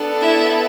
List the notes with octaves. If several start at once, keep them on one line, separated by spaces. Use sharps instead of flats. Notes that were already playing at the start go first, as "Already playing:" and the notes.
Already playing: B3 D4 A4
E4 E5